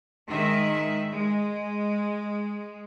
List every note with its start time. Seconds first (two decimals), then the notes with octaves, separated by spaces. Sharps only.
0.29 D#3 G#3 E5
1.12 G#3